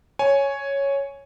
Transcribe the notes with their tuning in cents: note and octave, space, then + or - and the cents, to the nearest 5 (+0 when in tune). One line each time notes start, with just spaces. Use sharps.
C#5 +0 G#5 +5